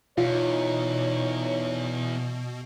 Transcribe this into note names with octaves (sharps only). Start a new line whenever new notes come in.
E2 B2 D#4 F4 C#5